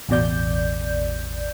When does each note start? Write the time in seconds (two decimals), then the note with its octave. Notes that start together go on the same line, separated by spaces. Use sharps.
0.09 A1 E2 B2 D5 G6